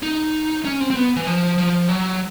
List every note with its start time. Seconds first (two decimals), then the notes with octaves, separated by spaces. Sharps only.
0.03 D#4
0.65 C#4
0.80 C4
0.91 C4
0.96 B3
1.16 E3
1.27 F3
1.58 F3
1.89 F#3